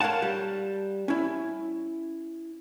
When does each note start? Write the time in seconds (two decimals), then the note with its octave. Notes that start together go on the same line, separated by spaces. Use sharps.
0.01 A#4 C#5 F5 F#5 A5
0.22 G3
1.08 C#4 E4